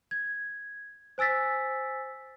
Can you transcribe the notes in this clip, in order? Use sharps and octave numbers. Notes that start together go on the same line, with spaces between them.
G#6
C5 G#5 E6 A6 B6